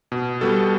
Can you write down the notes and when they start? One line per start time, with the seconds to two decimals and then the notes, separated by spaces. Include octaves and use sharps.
0.12 B2
0.41 G3 B3 F#4 A4